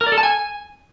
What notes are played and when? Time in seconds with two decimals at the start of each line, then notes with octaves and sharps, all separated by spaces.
0.01 A#4
0.06 D5
0.12 A4
0.18 A5
0.23 G#5